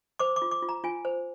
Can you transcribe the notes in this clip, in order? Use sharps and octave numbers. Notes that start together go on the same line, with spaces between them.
C5 D6
D6
F4
D6
F4
A#5
F4 G#5
C5